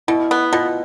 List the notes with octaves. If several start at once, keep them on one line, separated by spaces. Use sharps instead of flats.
B2 E4
B3
B2 F4